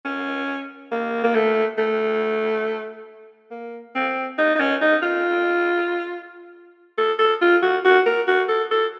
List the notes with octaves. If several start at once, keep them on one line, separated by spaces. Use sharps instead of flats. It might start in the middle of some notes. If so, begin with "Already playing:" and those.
C#4
A#3
A#3
A3
A3
A#3
C4
D#4
D#4
C#4
D#4
F4
A4
A4
F4
F#4
F#4
A#4
F#4
A4
A4